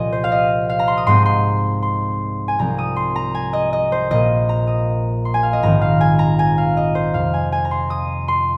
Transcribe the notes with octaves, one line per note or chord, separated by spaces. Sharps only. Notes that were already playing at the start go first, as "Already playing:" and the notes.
Already playing: C2 A#2 F3 D#5 G#5 C6
C5
F5
D#5
F5
A#5
C6
D#6
G#2 G#3 C4 C6
C6
C6
G#5
C2 C3 F3 C4 A#5
D#6
C6
A#5
G#5
D#5
D#5
C5
A#1 A#2 A#3 D#5
A#5
D#6
C6
G#5
F5
D#5
A#1 G#2 D#3 C4 A#5
F5
G#5
A#5
G#5
F5
D#5
C5
F2 C3 F3 A#3 F5
G#5
G#5
A#5
C6
D#6
C6